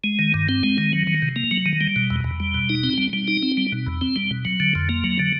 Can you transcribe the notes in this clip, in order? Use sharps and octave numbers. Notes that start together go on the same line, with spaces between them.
G#3
D#3
G2
C4
G#3
D#3
F#3
D#3
C3
A#3
F#3
D#3
G3
B2
E2
E2
G3
B2
D#4
C4
G3
G3
D#4
C4
G3
B2
E2
C4
G3
B2
F#3
D3
F2
A#3
F#3
D3